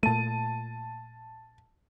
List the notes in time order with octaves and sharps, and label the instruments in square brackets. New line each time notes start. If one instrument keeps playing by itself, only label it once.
[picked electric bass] A#2 A3 [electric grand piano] A5 D#7